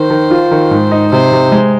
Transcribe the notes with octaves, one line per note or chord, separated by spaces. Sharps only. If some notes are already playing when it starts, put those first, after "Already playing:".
Already playing: D#3 C5
D#3
F4
D#3
G#2
D#4
C3 C5
C3
G#3